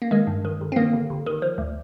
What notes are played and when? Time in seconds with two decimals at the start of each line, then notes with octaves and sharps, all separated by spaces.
0.02 A#3
0.11 D#3 G#3
0.27 G2
0.45 D#3
0.61 G1
0.72 C4
0.76 D#3 A#3
0.93 G1
1.10 G1
1.26 D#3
1.42 F3
1.58 D2